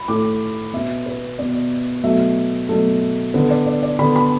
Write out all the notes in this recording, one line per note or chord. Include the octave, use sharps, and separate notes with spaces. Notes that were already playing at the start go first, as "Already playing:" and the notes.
Already playing: B5
A2 A3 D6
B2 B3 E5
B4
B2 B3 D5
B2 F#3 A3 E5
B2 F#3 A3
D3 B3 B4
D5
D5
D5
D3 B3 B5
B5